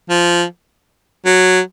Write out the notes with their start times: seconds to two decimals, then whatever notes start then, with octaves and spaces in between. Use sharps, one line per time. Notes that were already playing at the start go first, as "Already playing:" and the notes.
0.10 F3
1.25 F#3